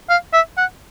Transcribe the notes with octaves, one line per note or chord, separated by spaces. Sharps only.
F5
E5
F#5